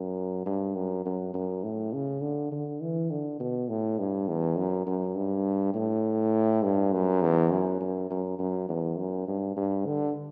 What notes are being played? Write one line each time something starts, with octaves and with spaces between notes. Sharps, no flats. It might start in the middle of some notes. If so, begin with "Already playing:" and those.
Already playing: F#2
G2
F#2
F#2
F#2
A2
C#3
D3
D3
E3
D3
B2
A2
G2
E2
F#2
F#2
G2
A2
G2
F#2
E2
F#2
F#2
F#2
F#2
E2
F#2
G2
G2
D3